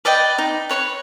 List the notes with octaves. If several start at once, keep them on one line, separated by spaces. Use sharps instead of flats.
B4 D5 D#5 G5
D#4
B4 C#5 C6 C#6